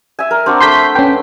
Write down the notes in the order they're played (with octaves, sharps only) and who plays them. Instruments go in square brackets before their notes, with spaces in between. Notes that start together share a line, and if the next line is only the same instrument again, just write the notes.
[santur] E5 G#5
A#4
C4 D4 F#4
[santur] A3 A5 [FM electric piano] C6 G6 B6
[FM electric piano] C#4 G5 [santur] B4